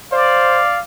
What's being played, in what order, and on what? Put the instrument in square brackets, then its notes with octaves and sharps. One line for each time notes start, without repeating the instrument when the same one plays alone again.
[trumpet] C5 [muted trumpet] D5 [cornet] F5